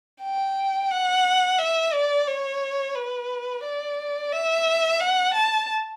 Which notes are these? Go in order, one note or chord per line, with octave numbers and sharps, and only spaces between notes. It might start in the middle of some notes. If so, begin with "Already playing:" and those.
G5
F#5
E5
D5
C#5
B4
D5
E5
F#5
A5